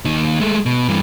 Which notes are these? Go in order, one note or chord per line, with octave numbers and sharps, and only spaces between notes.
D#2 D#3
G#3 A3
B2
G2 E3